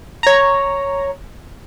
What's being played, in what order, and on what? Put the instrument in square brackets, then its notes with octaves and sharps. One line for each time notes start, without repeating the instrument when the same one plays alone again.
[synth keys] C#5 A#5